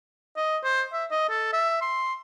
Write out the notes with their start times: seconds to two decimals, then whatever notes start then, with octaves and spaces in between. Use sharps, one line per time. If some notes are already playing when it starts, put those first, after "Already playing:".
0.36 D#5
0.64 C5
0.93 E5
1.11 D#5
1.29 A4
1.53 E5
1.82 C6